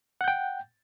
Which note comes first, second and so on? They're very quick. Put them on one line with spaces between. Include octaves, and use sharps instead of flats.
F#5 G6 G5